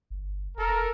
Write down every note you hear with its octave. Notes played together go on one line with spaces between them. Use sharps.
G1
F1 A4 A#4